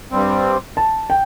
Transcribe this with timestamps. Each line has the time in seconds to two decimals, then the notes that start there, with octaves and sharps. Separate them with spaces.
0.11 G2 G3 C4
0.77 A5
1.10 G5